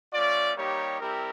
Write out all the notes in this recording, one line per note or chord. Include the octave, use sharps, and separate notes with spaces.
A3 C#4 F4 D5
G3 A#3 D#4 G4 C#5
G3 C4 E4 G4 A#4